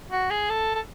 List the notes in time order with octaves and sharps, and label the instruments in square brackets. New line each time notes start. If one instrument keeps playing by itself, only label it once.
[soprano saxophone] F#4
G#4
A4
A4